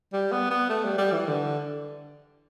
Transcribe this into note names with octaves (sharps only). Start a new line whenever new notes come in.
G3
B3
B3
A3
G3
G3
E3
D3